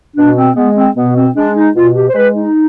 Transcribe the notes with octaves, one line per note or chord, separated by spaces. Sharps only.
B2 D4
C4
G#3 B3
C4
B2 B3
C4
G#3 D4
D#4
B2 F4
G4
C5
G#3 B4
D#4